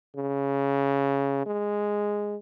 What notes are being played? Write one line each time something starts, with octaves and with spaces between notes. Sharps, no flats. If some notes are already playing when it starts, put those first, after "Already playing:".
C#3
G#3